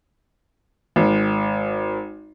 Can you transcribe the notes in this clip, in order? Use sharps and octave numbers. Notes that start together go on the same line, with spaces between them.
G#1